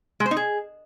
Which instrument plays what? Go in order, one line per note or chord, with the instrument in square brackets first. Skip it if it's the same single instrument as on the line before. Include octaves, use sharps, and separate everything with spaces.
[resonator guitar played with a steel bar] G#3
C5
D#4
G#4